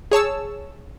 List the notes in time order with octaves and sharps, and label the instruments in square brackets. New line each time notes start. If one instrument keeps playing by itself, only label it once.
[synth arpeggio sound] G#4 C#5 A5 E6